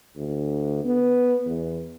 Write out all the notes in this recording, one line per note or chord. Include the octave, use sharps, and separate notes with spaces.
D2
B3
E2